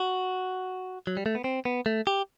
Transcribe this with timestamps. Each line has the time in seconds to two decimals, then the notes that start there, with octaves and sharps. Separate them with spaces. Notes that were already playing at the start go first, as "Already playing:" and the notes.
Already playing: F#4
1.07 F#3
1.17 G3
1.26 A3
1.35 B3
1.44 C4
1.65 B3
1.86 A3
2.07 G4